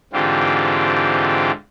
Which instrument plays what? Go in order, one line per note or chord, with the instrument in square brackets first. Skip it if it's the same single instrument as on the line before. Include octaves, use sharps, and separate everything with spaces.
[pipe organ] G#2 D3 E3 C4 F4 G4